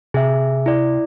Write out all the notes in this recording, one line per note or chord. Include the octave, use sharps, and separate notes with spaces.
C3 G#4 E5
E4 D5